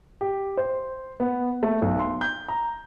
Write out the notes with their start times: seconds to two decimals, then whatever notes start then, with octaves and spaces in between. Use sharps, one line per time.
0.21 G4
0.57 C5
1.20 B3
1.63 A3
1.82 B1
1.99 C6
2.21 G6
2.48 A#5